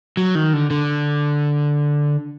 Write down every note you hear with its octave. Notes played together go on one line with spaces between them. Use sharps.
F#3
D#3
D3
D3